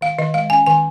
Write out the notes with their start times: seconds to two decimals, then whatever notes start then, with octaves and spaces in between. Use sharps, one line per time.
0.01 D#3 F5
0.19 D#3 D#5
0.34 G#3 F5
0.50 C#4 G#5
0.66 D#3 G#5